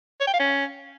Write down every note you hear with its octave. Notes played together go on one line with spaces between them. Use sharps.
C#5
G5
F5
C#4